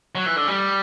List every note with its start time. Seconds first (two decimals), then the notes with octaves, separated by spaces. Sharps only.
0.15 F#3
0.26 E3
0.36 D3
0.47 G3